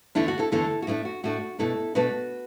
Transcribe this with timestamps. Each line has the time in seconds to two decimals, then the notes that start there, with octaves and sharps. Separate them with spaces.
0.15 E2 D3 A3 D4 E4
0.28 F#4
0.39 E4 A4
0.52 E2 D3 A3 D4 E4 A4
0.82 F#4
0.87 A2 A3 D4 E4
1.05 F#4
1.24 A2 A3 D4 F#4
1.59 B2 A3 D4 E4 A4
1.95 B2 A3 D4 F#4 B4